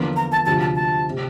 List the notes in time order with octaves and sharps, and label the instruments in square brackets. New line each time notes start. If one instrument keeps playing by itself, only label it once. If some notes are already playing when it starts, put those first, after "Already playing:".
Already playing: [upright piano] E2 D3 F3 A#3 F4
[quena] A#5
A5
[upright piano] D2 C3 F3 [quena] A5
[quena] A5
A5
[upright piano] C3